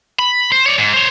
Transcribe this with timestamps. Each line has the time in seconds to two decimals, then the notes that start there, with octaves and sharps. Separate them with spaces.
0.19 B5
0.52 C5
0.66 C#5 D5
0.78 G#2
0.94 C5 C#5